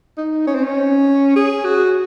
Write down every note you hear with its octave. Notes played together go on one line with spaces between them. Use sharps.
D#4
C#4
C4
C#4
G#4
F#4